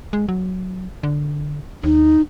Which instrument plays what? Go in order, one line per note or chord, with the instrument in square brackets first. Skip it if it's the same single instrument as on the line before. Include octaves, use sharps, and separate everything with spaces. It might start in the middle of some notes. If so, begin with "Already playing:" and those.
[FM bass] G#3
F#3
D3
[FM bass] D#2 [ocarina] D#4